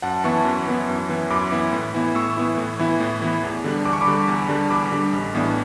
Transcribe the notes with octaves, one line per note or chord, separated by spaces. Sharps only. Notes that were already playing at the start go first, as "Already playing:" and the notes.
F#2 F#5 A5
E3 B3 E4 A5 C#6
F#2
E3 B3 E4
F#2
E3 B3 E4
F#2 B5 D6
E3 B3 E4
A2
E3 B3 E4
A2 C#6 E6
E3 B3 E4
A2
E3 B3 E4
A2
E3 B3 E4
E2
D3 G3 D4
E2 D6
C#6
B5 D6
D3 G3 D4
E2
D3 G3 D4
E2 B5 D6
D3 G3 D4
A1
A2 E3 B3 D4